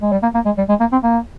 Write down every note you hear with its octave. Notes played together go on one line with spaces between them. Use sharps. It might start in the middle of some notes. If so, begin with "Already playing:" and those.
G#3
G3
A#3
A#3
G#3
G3
G#3
A#3
C4
A#3